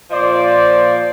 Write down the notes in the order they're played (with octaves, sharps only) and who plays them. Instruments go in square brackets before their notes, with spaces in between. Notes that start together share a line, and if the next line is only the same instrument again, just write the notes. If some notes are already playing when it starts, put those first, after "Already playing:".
[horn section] A#2 F3 C5 D5